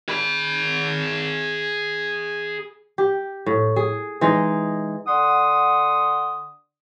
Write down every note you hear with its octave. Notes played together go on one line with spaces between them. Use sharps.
G#4 B5
G4
A2
G#4
E3 G#3 D#4
D3 F#5 C6 D#6